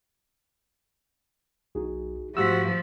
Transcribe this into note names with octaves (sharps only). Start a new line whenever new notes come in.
B1 D#4 F#4 G#4
G#2 F3 A3 F#4 G4 E6 B6